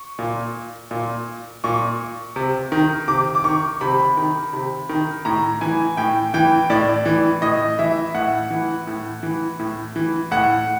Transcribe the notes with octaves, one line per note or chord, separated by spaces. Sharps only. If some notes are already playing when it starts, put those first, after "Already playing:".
Already playing: C#6
A#2
A#2
A#2 C#6
C3
D#3
C3 D6
D6
D#3 C#6
C3 B5
D#3
C3
D#3
A2 A#5
E3 G#5
A2 G5
E3 G5
A2 D5
E3
A2 D#5
E3 E5
A2 F#5
E3
A2
E3
A2
E3
A2 F#5